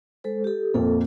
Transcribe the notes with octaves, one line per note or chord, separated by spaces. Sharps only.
G#3 A4 C5
G4 A4
F2 A#2 A#3 A4